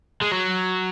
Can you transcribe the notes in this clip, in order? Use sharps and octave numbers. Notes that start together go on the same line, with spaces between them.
G#3
F#3